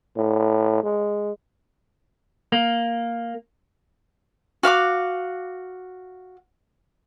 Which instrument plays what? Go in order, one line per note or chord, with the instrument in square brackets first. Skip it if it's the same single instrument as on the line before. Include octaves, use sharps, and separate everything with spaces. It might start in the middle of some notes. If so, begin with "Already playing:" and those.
[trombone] A2
G#3
[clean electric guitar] A#3
[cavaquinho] F#4 F5 A#5 D6